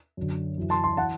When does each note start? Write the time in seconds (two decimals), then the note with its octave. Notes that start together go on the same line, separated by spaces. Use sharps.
0.17 F#2 D3
0.58 F#2 E3
0.70 A5 C6
0.84 A5 C6
0.97 E3 F#5 A5